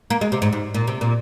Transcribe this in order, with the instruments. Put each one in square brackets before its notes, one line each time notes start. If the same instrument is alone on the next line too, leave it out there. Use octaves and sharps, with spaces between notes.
[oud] A#3
G#3
C3
G#2
G#2
A#2
C3
A#2